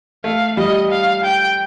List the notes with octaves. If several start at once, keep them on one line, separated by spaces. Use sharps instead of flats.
A3 F5
G3 D#5
F5
G5